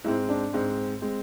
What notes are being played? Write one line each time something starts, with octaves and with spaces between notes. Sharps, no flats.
G#2 G#3 C4 E4
D4
G#2 G#3 C4
G#3 C4